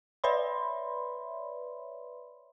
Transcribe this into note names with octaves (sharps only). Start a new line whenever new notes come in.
B4 C#5 D5 E5 B5 C6